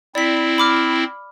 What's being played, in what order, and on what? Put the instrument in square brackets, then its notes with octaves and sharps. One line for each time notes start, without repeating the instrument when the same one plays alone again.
[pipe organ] C4 E4 [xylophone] D5 B6
[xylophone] B5 D6 F6